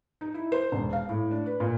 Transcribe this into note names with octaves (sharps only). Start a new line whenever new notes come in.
D#4
E4
C5
E1
F5
A2
D4
B4
A#2